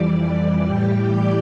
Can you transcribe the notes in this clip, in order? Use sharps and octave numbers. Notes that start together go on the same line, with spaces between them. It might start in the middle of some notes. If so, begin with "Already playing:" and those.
Already playing: F2 E3 G3 D5 D6
D5 D6
A2 E3 G3 G4 G5
D5 D6